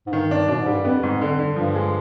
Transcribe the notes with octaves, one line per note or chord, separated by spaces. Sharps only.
G#2
G2 D#3
G2 D4
B2 D4
G#2
G3
G2
F2 B3
G#2
D3
D3
G2 F3
G#3